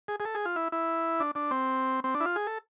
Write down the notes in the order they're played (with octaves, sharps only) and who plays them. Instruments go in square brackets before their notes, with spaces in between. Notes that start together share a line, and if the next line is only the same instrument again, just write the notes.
[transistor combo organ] G#4
G#4
A4
G#4
F4
E4
E4
D4
D4
C4
C4
D4
E4
F4
G#4
A4